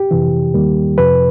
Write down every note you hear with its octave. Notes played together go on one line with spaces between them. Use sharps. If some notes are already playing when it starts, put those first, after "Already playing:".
Already playing: G4
F2 C3 E3
D#2 D#3 G3 A#3
F2 C3 F3 B4